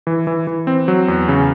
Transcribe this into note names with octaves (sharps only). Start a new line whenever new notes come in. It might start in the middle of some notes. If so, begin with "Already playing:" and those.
E3
E3
E3
C4
F#3
E2
C#3